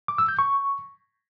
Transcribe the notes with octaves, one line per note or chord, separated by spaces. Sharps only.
D6
E6
G6
C#6